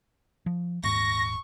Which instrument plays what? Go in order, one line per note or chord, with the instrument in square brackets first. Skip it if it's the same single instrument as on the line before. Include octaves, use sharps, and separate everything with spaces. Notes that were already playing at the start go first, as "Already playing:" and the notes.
[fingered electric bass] F3
[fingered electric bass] D#1 G#2 [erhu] C#6 [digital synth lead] A#6